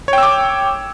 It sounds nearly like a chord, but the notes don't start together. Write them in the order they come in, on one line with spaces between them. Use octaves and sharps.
C#5 G5 E6 D6